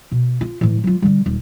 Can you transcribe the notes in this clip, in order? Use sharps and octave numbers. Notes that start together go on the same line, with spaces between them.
B2
F4
A2 E3
F#3 F4
D3 G3
D#1